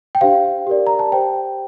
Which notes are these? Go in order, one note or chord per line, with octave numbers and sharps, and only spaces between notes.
G5
D4 G4 C5 F5
G4 A#4 D5
A#5
A5
G4 C5 G5